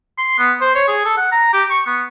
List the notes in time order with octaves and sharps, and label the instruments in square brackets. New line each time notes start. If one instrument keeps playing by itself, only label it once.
[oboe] C6
B3
C5
C#5
G#4
A4
F#5
A#5
G4
C#6
B3